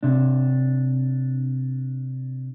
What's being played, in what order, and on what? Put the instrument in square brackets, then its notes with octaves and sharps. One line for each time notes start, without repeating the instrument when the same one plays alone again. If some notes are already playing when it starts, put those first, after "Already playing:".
[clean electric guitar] C3 D4